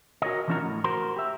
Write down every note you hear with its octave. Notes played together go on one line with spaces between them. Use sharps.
F#4 A#4 C#5 D#5
E3 F3 C#4 D4 F#4 A#4
A2
F#4 A#4 C5
G4 E5